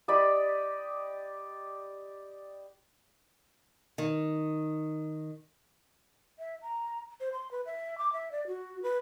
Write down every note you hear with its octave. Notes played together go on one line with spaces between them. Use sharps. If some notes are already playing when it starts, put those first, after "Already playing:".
G4 D5 D#5 B5
D#3
E5
A#5
C5
C6
B4
E5
D6
E5
D5
F#4
B4